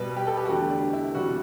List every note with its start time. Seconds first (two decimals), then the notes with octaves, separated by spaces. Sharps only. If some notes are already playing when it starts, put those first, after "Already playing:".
Already playing: B2 G3 B4
0.16 G4
0.27 A4
0.37 G4
0.45 F#4
0.49 E2 D3 A3 G4
0.71 D4
0.93 E4
1.14 E2 C3 E3 G3 F#4